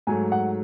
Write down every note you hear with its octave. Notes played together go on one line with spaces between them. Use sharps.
G#2 F#3 A3 G#5
F#5